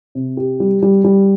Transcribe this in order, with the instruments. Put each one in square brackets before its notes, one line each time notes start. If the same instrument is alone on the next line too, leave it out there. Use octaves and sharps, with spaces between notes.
[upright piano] C3
G4
G3
G3
G3